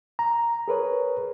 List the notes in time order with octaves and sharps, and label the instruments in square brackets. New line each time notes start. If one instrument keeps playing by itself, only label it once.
[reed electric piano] A#5
G#4 A#4 B4 C#5